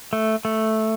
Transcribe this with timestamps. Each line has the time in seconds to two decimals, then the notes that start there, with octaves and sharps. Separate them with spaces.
0.13 A3
0.45 A3